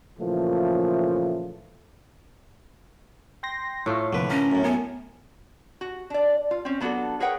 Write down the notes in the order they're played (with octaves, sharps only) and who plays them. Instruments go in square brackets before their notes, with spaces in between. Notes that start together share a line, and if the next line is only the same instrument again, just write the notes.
[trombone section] A#2 C#3 E3 F3 A3
[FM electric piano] G5 C6 A#6
[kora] A2 A3 F4
[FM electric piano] C2 F2 A#3 [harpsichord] D3 B4
[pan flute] C#4 [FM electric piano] A#4 A#5
[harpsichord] F#2 A2
[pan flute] B3 [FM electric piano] A#4 G#5
[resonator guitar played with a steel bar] F#4
D4 D5
F4
C4 C#4
F#3 B3 D4 F4 F#4 A4
G#4 A#4 B4 C#5 F#5 G5